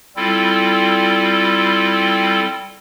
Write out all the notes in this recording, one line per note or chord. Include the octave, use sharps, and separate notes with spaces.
G3 C4 E4 F4 A4